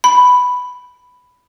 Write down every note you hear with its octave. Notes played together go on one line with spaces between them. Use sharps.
B5